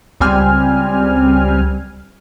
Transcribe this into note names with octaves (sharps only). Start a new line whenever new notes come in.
C#2 G3 C4 G#5 F6